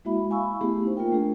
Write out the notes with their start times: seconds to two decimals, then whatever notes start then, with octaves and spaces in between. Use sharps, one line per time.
0.05 G#3 A#3 E4 F#4 E5 B5
0.30 F5 G#5 B5 C#6 E6
0.61 A3 B3 E4 G4 G#4
0.82 D#4 C5
0.97 A#3 F4 A#4 G5
1.12 A3 D4 E4 G#4